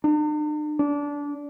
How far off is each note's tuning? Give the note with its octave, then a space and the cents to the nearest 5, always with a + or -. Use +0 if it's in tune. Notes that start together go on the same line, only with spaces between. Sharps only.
D4 +45
D4 -20